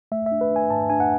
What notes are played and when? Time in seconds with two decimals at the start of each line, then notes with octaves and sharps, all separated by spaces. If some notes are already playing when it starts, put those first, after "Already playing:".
0.12 A3 E5
0.26 E5
0.32 D4
0.41 B4
0.51 D4 G#5
0.70 G#2 A5
0.90 D4 G#5
1.00 F#5